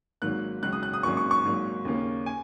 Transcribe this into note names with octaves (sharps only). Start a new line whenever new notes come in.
G#1 G#2 D#3 F#3 A#3 F#6
C#2 C#3 F#3 F#6
D#6
F#6
D#6
G#1 F#2 F#3 A#3 C#4 C#6
C#6
C#6
G#1 G#2 F#3 A#3
D#2 C#3 A#3 C#4
G#5